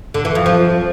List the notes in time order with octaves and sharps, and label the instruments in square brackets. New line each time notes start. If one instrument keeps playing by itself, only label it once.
[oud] D3
E3
F2
F3